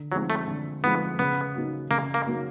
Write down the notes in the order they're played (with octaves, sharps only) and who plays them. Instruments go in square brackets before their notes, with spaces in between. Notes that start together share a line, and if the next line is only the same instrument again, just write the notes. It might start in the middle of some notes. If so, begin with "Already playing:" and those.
Already playing: [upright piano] D3
[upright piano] F3 G#3 C4 D#4 [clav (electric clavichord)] F#3
[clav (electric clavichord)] A3
[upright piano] D3
[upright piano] F3 G#3 C4 D#4 [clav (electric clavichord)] B3
[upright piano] C#3 [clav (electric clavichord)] B3
[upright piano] F#3 A#3 D#4
[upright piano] C#3 [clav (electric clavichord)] A#3
[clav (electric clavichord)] A#3
[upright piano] F#3 A#3 D#4